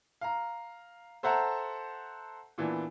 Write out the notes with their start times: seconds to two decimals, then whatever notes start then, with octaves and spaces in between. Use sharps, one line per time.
0.21 F5 A#5
1.23 A4 C5 E5 F#5 A5 A#5
2.58 A#2 E3 B3 D4